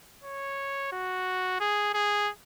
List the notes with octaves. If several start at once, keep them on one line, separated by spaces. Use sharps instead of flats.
C#5
F#4
G#4
G#4